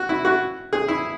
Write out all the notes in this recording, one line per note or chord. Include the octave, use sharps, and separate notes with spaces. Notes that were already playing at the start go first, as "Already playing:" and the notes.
Already playing: F#4
E4
F#4
G#4
E4